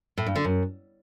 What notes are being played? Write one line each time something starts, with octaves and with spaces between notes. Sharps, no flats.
A2
G2
D3
F#2